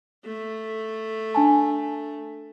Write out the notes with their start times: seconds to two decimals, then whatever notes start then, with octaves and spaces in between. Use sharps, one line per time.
0.25 A3
1.35 D4 G#5 A5